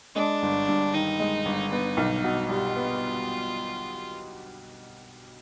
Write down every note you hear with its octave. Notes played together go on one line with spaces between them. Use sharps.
G#3 D4
G1
G2
D#3 D#4
G#3
G1
B3 D#4
B1
B2
G3 F4
B3